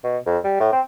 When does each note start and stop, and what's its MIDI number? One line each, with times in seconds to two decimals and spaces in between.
0.04 0.18 47
0.26 0.38 41
0.44 0.56 55
0.60 0.71 45
0.72 0.81 60